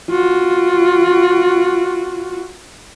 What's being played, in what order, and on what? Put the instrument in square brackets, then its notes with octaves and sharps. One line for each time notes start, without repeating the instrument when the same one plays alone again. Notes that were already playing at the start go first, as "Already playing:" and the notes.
[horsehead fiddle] F4 F#4